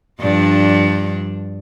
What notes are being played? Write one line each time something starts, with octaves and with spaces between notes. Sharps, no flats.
G2 F3 D4